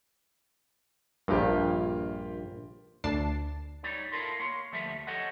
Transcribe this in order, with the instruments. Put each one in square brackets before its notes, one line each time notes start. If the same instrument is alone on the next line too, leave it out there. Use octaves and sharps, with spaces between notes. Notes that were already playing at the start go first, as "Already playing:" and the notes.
[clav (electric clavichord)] A#1 G2 [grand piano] A#3 F4 G4
[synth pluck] D2 D4 A5 C7
[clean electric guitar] G3 D#4 C#5 D5
E4 F4 A4 A#4 C6
A#3 C#5 C6
D2 F3 G3 A3 E5
G4 A4 C#5 D#5 F#5